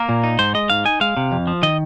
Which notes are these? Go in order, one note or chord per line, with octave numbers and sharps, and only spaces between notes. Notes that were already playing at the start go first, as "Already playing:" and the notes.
Already playing: A#3 A#4
A#2
D#4
G#2 C5
G#3 D#5
G#2 F5
D#4 G#5
G#3 F5
C3
F2
F3
D#3 D#5